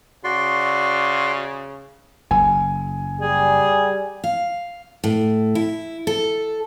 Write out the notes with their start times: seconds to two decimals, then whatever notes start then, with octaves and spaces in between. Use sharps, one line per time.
0.24 C#3 F#4 D5 C6
2.31 F#1 G#5
3.21 G3 G#4
4.24 F5
5.04 A2
5.55 E4
6.07 A4